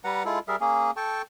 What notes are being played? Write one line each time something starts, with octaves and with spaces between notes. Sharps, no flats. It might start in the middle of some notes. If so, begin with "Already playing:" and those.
G3 B4 F#5 A#5
G#3 E4 F4 A4
G3 G#4 A#4 E5
A#3 C#4 G#4
A4 G5 A5 C#6